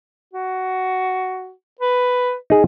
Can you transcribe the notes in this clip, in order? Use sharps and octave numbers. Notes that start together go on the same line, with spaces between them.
F#4
B4
D#4 G#4